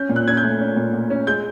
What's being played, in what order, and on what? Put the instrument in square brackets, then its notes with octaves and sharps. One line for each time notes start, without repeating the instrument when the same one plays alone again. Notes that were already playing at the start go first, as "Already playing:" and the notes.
Already playing: [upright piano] C#4 G6
A#2
F#6
C#4 G#6
G6
A3
C#4
A#2
A#2
C#4
G#3 G6